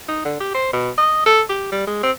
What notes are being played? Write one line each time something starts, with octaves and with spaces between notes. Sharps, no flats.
D#4
D3
G4
C5
B2
D#5
A4
G4
G3
G#3
C4